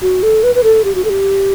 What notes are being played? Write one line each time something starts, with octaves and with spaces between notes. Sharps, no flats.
F#4
A4
B4
B4
A4
G4
F#4
A4
G4